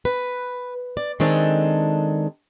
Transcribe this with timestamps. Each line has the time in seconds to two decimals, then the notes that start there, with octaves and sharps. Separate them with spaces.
0.05 B4
0.97 D5
1.20 D#3 G#3 C4 D4 A4